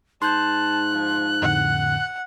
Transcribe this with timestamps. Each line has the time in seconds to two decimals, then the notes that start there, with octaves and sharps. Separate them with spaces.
0.22 G#2 A5 C6 F#6 G6
0.92 F3
1.42 F2 A2 D3 F#5